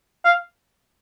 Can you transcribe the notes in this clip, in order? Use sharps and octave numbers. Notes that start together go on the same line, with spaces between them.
F5